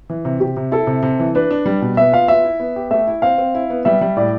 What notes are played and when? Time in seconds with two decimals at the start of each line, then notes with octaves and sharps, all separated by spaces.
0.10 E3
0.25 C3
0.40 C3 G4
0.57 C3
0.72 E4 A4
0.87 C3
1.03 C3
1.20 E3
1.35 D4 B4
1.51 D4
1.66 G3
1.81 B2
1.97 B3 E5
2.12 F4 F5
2.28 B3 E5
2.44 E4
2.60 B3
2.76 G4
2.91 A3 E5
3.07 E4
3.22 C4 F5
3.38 C4
3.55 E4
3.70 B3
3.85 G3 E5
4.01 G3
4.16 A2 D5